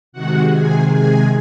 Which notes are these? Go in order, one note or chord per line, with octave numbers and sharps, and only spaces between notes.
C3 D#3 G#3 F#4 F#5
G#4 G#5
G#4 G#5